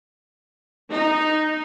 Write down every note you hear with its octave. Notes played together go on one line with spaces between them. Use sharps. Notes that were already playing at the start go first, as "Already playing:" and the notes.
D#4